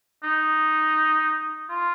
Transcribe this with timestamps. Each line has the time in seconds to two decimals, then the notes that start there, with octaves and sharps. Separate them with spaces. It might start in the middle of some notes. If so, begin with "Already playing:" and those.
0.24 D#4
1.70 F4